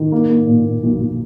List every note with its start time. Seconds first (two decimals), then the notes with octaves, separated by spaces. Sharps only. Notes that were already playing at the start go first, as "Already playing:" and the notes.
Already playing: D#3
0.12 A#3
0.30 A#3
0.47 A#2
0.65 A#2
0.83 B1
1.00 B1